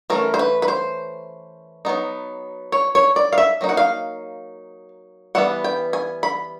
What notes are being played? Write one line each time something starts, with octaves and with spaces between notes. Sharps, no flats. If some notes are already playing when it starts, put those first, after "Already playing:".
E3 A3 C#4 A#4
C5
B4
B4
C5
F#3 B3 D#4
C#5
C#5
D5
F5
E5
F#3 A#3 D#4
F#5
F5
E3 G3 B3 F#5
G5
G#5
B5